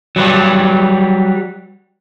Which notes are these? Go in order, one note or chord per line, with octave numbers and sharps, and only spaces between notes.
F#3 G3 B4